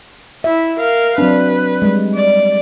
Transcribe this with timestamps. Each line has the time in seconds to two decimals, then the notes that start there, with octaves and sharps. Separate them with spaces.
0.44 E4 E5
0.79 A#4 F5
1.18 F#3 C4 D4 B4
1.82 G3 G#3
2.15 D5